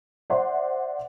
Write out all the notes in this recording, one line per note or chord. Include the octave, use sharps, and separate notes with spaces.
C5 D5 E5 F#5 C6